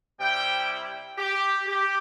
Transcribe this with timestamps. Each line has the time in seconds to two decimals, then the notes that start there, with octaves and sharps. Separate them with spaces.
0.20 C3 G3 E4 G5
0.69 G5
1.18 G4
1.67 G4